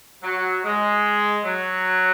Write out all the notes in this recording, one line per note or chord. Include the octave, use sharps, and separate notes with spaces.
F#3
G#3
F#3